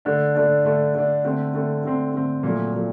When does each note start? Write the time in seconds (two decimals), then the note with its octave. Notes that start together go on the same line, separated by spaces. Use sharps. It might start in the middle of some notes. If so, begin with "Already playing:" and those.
0.05 D3 A3 D4
0.35 D3 A3 D4
0.65 D3 A3 D4
0.95 D3 A3 D4
1.24 D3 A3 C4
1.54 D3 A3 C4
1.84 D3 A3 C4
2.14 D3 A3 C4
2.43 A#2 F#3 A3
2.73 A#2 F#3 A3